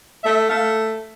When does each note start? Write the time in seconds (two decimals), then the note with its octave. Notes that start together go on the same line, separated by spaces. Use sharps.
0.24 A3 E5
0.49 A3 F5